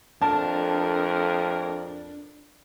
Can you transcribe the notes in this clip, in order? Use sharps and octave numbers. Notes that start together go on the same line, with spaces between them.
F2 A3 A#3 D4 A#4 A5